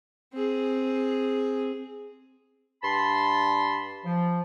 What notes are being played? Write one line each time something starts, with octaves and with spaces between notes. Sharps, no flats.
C4 G#4
G2 A5 B5 C6
F3